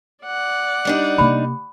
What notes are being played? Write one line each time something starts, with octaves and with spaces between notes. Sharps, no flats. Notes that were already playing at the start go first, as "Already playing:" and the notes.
D5 F#5
G3 D4 D#4
C3 A#3 B5